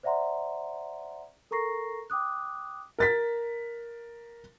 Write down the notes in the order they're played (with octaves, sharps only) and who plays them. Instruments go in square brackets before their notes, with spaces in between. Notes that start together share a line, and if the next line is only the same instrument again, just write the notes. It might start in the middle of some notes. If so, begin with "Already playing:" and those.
[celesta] C5 D5 E5 F#5 A#5 C6
A4 A#4 A#5 C#6 A#6 C7
G5 D6 D#6 F#6
[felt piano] A#4 A6 B6